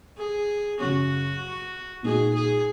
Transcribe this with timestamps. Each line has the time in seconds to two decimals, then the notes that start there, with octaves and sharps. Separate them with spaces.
0.17 G#4
0.79 F#2 C#3 F#3 C#4 F#4
2.03 A#2 G#3 D#4 F#4 G#4
2.35 G#4